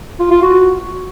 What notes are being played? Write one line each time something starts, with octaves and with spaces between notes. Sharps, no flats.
F4
F4
F#4